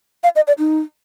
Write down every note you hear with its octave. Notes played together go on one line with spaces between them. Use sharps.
F5
D#5
D5
D#4